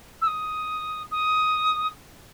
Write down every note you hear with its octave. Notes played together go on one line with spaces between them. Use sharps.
E6
D#6
D#6